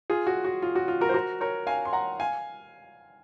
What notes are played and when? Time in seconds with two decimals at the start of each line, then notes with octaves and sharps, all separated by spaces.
0.10 F4 G#4
0.27 F#4
0.44 F#4
0.62 F4
0.75 F#4
0.88 F4
1.01 F#4 A#4
1.09 C5
1.14 F#4 A#4
1.41 A#4 C#5
1.67 F5 G#5
1.85 C6
1.93 F#5 A#5
2.20 F5 G#5